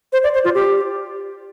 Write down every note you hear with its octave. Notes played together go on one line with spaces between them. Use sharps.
C5
D5
C5
F4
G4